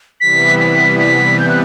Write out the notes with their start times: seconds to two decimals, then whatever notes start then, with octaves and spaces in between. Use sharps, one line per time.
0.21 C3 E3 G3 B3 B6
0.59 B6
0.99 B6
1.39 G6
1.49 F#6